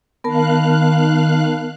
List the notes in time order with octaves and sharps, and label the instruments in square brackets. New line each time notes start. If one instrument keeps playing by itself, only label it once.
[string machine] D#3 F5 F#6 [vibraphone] B3 A#4 A5